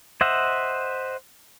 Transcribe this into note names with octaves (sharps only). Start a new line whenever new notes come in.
C5 D#5 E5 F#5